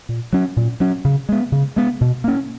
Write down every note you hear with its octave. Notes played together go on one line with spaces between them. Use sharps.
A#2
F#3 C#4
A#2
F#3 C#4
C#3
G#3 B3
C#3
G#3 B3
B2
A#3 C#4